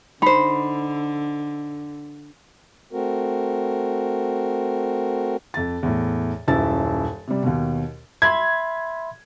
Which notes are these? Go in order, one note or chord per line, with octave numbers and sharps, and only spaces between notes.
D3 D#4 C5 B5
A3 C4 F#4 A#4
F2 A6
E2 A2
D#1 F#2 E4 E6 A6
C3 G3
D#2 B2
E5 B5 C6 G#6